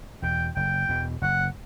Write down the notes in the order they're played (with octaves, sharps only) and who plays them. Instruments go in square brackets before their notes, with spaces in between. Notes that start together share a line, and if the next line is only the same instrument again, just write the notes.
[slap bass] E2 B2 [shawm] G5
[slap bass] F#1 [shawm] G5
[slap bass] E2 B2
[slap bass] F#1 [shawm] F#5